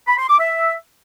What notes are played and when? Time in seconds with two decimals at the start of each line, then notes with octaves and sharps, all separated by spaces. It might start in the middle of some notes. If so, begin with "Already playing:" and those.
0.08 B5
0.18 C6
0.29 D6
0.39 E5